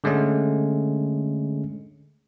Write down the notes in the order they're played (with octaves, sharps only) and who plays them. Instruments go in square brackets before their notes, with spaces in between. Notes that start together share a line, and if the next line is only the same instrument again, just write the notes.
[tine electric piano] D3 G#3 A3 C#4